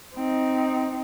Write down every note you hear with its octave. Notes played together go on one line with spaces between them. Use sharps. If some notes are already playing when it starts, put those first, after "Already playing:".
C4 D#4